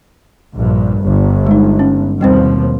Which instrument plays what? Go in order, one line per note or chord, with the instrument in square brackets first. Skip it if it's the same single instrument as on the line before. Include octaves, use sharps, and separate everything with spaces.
[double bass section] A#1 G2
G1
[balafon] G#3 D#4
C#4
[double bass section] D#2 B2 F3 [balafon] G3 C4 C5